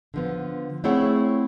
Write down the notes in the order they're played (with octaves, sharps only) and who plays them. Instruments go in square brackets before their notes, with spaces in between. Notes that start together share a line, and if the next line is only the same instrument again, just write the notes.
[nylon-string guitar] D3 F3 B3
A3 C4 E4 G#4 C#5 F#5